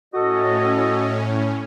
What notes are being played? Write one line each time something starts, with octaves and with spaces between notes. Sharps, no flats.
A2 C#4 F#4 A4 D#5